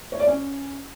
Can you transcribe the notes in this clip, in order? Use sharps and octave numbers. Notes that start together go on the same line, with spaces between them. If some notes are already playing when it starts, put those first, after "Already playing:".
C#5
D5
C#4